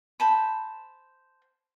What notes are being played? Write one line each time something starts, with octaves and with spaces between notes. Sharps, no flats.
C5 A5 B5